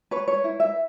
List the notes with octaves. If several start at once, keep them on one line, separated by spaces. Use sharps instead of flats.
B4 C#5
C#5
E4
E5